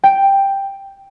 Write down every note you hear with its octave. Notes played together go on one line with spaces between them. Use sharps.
G5